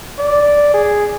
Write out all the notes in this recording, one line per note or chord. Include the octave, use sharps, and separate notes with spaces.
D5
G#4